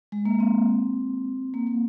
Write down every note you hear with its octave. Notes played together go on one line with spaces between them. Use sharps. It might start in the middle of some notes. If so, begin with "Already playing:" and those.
G#3
A#3
C4
A#3
A#3